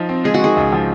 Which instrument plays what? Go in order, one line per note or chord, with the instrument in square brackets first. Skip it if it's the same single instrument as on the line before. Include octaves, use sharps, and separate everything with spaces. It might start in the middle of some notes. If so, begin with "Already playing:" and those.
Already playing: [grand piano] F3 D#4
C4
[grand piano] G#3 [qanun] G#4
[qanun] F#4
[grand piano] D#3 [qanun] G#4
[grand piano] C#2
F3